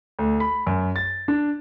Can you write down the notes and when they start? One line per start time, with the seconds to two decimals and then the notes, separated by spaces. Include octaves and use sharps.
0.19 D2
0.40 B5
0.67 F#2
0.96 A6
1.28 D4